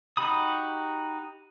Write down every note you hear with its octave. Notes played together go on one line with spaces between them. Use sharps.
D#4 F#4 G4 B5 D#6